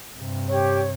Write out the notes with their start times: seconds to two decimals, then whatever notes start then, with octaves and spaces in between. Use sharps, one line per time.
0.17 G2 C3
0.48 G4 C#5